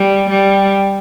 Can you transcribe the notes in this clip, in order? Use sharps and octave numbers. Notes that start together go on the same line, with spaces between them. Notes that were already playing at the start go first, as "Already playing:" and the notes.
Already playing: G3
G3